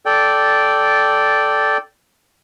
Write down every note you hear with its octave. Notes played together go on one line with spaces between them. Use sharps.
A4 D5 G5